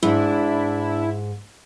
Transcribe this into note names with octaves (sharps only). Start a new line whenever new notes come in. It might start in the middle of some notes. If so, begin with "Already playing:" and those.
G#2 D4 E4